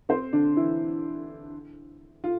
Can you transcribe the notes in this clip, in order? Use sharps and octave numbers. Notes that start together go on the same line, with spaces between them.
C4 C5
D3 D4
E3 E4
F4